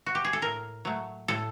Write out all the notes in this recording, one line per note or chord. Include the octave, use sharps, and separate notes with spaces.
F#4
G4
G#4
A4
A2 A#4
F#3 A3
A2 A4